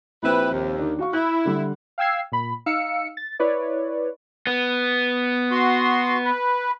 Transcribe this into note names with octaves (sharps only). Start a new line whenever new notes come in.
A#1 C4 E4 G4 B4
D#2
D#3 D4
F#4 F5 C#6
E4 F#6
D3 G3
F5 G5 E6 G#6 C7
A#2 B5
D#4 F5 E6 C#7
A6
E4 B4 C#5 D5
B3
F#4 C6
B4